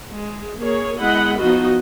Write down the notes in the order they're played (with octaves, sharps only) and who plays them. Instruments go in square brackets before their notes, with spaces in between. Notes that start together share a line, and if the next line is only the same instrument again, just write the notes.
[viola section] G#3
A#3 G#4 A#4 C#5
G#3 B3 E4 D#5 F#5 B5
F3 B3 D#4 F#4 D#5